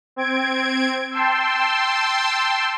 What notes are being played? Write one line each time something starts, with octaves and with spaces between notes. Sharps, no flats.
C4 G#6 D7
G5 A5 C6 E6